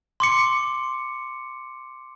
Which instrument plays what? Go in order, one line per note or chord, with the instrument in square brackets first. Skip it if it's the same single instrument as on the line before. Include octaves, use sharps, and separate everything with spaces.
[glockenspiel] C6 D6 C#7